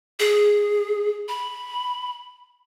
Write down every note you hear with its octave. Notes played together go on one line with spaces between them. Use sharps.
G#4
B5